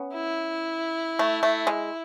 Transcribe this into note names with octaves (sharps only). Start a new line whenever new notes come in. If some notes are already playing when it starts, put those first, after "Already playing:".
Already playing: B3 C#4
E4
A3
A3
G#3